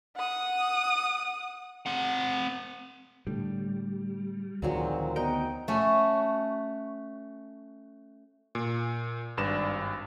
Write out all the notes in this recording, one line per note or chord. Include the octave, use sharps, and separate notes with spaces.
F#5 D#6
C4 F#5
A2 D3 G3
D2 A#2 D#3 F3 F#3 G#3 C4
B3 D#4 F#4 A#4 G5
A3 C#4 F#4
A#2
G#1 G2 B4 D5 E7